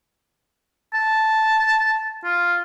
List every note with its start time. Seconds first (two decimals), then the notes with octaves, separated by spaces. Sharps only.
0.94 A5
2.24 F4